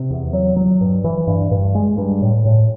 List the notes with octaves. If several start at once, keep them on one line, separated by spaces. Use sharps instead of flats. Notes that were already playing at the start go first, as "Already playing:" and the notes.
Already playing: C3
E2
F#3
F#3
G2
E3
G2
G2
G#3
G2
A2
A2